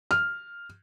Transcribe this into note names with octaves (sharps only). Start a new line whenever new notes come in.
F6